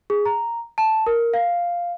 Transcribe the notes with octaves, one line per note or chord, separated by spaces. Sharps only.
G#4
A#5
A5
A#4
F5